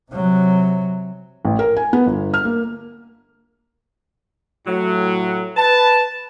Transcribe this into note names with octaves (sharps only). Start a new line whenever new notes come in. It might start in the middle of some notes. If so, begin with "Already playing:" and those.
C3 F#3
A1
A#4
G#5
B3
G1
F6
A#3
A2 F#3
B4 A5